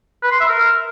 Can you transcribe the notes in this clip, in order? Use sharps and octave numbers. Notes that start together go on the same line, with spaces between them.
B4
C6
E5
A#4